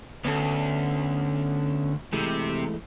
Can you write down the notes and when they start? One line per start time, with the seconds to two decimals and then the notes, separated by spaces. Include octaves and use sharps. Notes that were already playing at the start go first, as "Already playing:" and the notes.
0.25 D2 B3 C#4 A4
2.13 C3 E3 G#3 A3